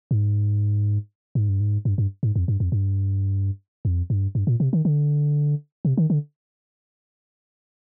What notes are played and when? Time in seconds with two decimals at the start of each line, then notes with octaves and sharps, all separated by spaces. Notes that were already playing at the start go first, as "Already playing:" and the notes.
0.11 G#2
1.35 G#2
1.49 G2
1.60 G#2
1.85 G2
1.98 G2
2.23 G#2
2.36 F2
2.48 G2
2.60 F2
2.72 G2
3.85 F2
4.10 G2
4.35 G2
4.47 A#2
4.60 C3
4.73 D#3
4.85 D3
5.85 C3
5.98 D#3
6.10 D3